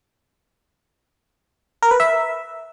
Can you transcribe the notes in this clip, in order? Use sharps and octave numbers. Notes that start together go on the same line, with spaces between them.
A#4
B4
E5